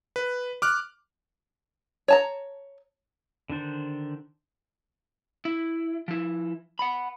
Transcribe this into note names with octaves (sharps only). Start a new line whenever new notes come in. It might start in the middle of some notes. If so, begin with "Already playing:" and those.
B4
D6 F6 F#6
C#5 A5 A#5
D3 D#3 D4 C5
E4
F3 E4
F#5 B5